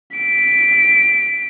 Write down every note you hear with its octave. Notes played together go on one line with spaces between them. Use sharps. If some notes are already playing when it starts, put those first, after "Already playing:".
B6 D7